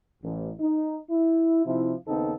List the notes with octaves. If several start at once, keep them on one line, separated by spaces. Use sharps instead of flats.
A1
D#4
E4
C3 F3 D#4 E4
D#2 C#3 B3 C4 D#4 A4